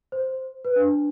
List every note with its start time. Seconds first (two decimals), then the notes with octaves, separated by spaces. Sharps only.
0.12 C5
0.65 B4
0.76 D4